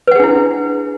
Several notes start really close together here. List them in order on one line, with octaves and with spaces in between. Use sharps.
B4 F#5 G#4 D4 E4